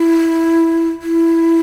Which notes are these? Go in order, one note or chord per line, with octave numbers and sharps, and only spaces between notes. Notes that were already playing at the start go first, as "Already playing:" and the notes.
Already playing: E4
E4